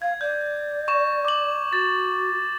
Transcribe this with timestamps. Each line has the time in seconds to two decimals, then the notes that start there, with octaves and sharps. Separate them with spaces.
0.02 F5 G#6
0.21 D5 G6
0.88 C#6 E7
1.25 D6 F#7
1.73 F#4 A6